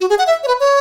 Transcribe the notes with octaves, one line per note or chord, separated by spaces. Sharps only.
F#4
G#4
F#5
E5
C#5
B4
C#5